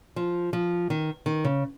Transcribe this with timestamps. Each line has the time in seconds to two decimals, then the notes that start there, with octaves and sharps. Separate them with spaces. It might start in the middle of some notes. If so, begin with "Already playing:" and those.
0.16 F3
0.53 F3
0.90 D#3
1.26 D#3
1.44 C#3